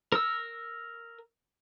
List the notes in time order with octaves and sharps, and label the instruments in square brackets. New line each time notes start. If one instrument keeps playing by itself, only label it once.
[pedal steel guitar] A#4 E6